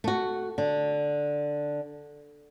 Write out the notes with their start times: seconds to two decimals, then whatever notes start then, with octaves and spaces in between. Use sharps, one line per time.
0.04 A3 F#4
0.58 D3